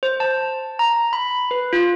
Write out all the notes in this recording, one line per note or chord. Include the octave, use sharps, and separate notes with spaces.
C5
A5
A#5
B5
B4
F4